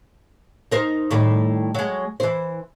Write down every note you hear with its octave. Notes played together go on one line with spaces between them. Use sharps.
D#4 A#4 C5
A2 D#3 G3
F#3 G#3
E3 C5